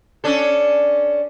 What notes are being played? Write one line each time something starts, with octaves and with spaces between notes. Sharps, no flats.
C#4 D4 A4